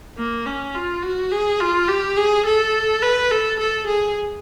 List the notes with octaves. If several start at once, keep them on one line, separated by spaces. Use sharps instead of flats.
A#3
C#4
F4
F#4
G#4
F4
G4
G#4
A4
B4
A4
A4
G#4